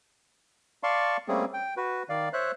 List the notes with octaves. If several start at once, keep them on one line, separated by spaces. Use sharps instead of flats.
D5 F5 A5 C6 C#6
G3 A3 A#3 C4 C#4 G#4
G5
F#4 B4
D#3 D5 F5
C5 C#5 E5 F#6